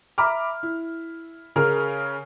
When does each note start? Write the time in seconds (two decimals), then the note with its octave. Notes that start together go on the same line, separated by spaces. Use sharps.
0.18 E5 A#5 B5 D6 F6
0.63 E4
1.56 C#3 G#4 A#4 F6